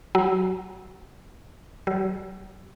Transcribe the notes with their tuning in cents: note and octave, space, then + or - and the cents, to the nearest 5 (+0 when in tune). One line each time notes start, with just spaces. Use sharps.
F#3 +15
F#3 +45